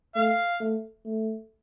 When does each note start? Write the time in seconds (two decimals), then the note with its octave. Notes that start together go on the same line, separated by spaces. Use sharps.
0.15 A3 F5
0.60 A3
1.06 A3